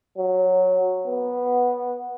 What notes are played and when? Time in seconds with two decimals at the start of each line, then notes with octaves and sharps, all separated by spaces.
0.17 F#3
1.07 B3